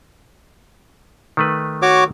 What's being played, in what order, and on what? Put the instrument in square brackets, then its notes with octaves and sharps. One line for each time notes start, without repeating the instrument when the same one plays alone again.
[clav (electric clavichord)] D#3 A3 B4
[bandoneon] F#4 C#5 D6